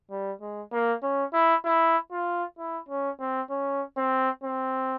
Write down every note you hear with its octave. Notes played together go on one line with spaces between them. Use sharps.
G3
G#3
A#3
C#4
E4
E4
F4
E4
C#4
C4
C#4
C4
C4